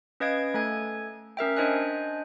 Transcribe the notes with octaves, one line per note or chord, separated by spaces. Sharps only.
C#4 B4 D#5 F5 G#6 D7
A3 A4 G#5 G#6
C#4 A#4 E5 G5
D4 C5 D#5 G#5 F#6